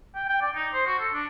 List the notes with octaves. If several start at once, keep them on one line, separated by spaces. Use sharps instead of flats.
G5
G5
D5
D#4
C5
F#4
A4
D4